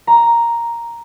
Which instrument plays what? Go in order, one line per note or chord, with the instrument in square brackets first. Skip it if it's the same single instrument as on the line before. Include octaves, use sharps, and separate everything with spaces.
[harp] A#5